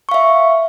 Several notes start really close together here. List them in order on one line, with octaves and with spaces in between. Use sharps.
C#6 F5 E5